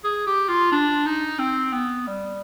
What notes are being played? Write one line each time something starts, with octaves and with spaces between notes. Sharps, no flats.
G#4
G4
F4
D4
D#4
C4
B3
G3